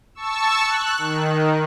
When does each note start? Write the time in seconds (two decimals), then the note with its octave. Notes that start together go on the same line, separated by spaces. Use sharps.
0.15 A5 C#6 E6
0.62 F#6
0.98 D#3